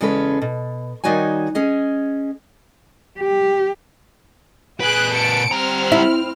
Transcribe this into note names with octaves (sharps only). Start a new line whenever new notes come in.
E2 C#3 G#3 C#4 A4 B4
B2
D#3 G3 D#4 F#4 C#5 G#5
C#4 G#4 D#5
G4
A#2 G#4 B4 F#6 D7
A5 C#7 D7
G3 C4 A#5 F6
E4